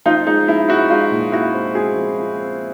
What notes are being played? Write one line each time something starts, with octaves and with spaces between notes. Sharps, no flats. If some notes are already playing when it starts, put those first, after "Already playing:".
F3 D#4 F4
G#3 D#4
F3 E4
G#3 E4 F#4
G#3 D#4 F4
A#2
G#3 E4 F#4
C4
G#3 F#4 G#4
F3
F3
C4